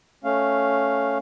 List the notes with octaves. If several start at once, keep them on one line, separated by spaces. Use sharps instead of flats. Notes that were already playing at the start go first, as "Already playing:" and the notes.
A3 C#4 F5